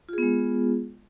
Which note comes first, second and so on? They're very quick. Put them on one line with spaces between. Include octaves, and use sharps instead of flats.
F4 G#4 B3 G#3